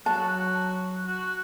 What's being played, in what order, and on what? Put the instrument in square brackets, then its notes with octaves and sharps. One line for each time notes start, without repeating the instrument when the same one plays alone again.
[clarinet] F#3 [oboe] F#4 [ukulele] A5
[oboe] F#4